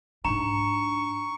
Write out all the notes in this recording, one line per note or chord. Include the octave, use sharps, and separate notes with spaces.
G#2 D4 A#5 C#6